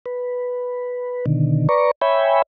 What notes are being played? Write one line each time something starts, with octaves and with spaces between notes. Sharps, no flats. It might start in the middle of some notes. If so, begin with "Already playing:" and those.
B4
B2 D3 D#3
B4 D5 A#5 C#6
C#5 E5 G5 G#5 B5